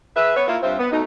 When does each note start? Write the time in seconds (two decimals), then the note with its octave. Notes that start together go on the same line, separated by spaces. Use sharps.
0.16 G#4 B4 E5
0.35 B3 B4 C#5
0.47 A#3 E4 F4
0.63 G2 C4 F4 C5 E5
0.79 B3
0.91 B2 A3 D#4